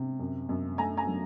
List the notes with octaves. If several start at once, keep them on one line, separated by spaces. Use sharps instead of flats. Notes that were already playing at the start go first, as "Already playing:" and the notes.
Already playing: C3
F#2
F#2
A3 G#5 A#5
G#5 A#5
F#3